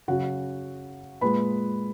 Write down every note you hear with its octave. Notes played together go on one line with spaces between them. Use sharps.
C#3 F#3 F#4 F#5
A#2 G#3 B4 B5